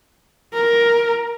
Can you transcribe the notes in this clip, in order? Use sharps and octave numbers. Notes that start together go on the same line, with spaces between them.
A#4